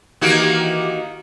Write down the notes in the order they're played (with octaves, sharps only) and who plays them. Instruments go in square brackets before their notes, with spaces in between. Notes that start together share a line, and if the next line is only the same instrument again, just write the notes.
[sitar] D#3 A#3 F#4 [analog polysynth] E3 G4 D6